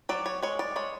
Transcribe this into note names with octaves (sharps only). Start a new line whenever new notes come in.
F#3 D5
C#5
G#3 C#5
D5
G#3 C#5